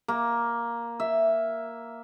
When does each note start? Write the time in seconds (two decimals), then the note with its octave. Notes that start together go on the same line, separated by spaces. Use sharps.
0.08 A#3
1.00 E5